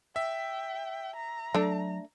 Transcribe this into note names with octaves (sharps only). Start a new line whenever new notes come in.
E5 G5
A#5
F#3 A3 D4